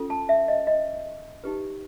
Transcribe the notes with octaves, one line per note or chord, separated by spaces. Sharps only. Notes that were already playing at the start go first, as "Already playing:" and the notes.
Already playing: C#4 F4 A4
A5
E5
D#5
D#5
D#4 G4 B4